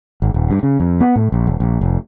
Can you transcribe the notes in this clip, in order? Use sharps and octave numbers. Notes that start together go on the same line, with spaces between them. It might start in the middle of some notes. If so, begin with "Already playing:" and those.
G#1
D#1
G2
C#3
F2
B3
A2
A#1
E1
A#1
F1